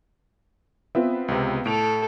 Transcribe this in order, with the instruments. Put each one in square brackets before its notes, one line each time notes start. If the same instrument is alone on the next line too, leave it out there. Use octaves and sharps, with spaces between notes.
[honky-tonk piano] B3 F4 [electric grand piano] C4 E5
[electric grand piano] C#2 C3
[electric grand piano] A2 [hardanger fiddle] A4 [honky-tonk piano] D7 F7